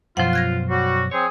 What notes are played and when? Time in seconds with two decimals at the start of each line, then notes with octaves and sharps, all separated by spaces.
0.17 F#2 B2 F3 F4 C5 F#5
0.33 F#6 G#6 A#6
0.68 F#3 G3 F#4
1.11 C4 G#4 C#5